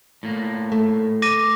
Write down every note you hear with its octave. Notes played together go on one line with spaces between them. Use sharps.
A2 A#3
A3
D6 A#6 D#7